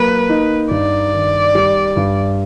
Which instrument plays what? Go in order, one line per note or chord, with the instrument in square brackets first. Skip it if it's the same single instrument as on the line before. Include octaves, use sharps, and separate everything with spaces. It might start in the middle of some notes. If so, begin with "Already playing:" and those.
Already playing: [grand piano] F#3 A#3 [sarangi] B4
[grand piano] D#4
[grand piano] G2 [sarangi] D5
[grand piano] D#3
G3
G2